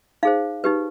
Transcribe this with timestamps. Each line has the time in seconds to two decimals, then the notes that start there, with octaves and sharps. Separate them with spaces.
0.23 D#4 G#4 C5 F5
0.64 D#4 G4 B4